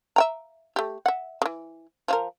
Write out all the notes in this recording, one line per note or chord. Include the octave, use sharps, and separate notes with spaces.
E5 G5 A#5
A3 G4
E5 F#5
C#3 E3
F3 F4 A#4